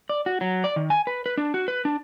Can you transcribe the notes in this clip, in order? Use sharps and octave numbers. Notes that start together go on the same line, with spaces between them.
D5
F#4
F#3
D5
D#3
G#5
B4
B4
D4
F#4
B4
D4